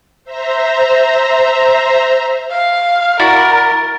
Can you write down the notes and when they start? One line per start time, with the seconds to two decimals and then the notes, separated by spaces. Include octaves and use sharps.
0.24 C5 E5 A#5
2.51 F5
3.20 E4 F#4 A#4 D5 A6